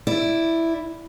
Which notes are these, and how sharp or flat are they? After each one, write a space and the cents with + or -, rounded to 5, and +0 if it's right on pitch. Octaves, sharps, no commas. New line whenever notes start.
E4 +0 D5 +0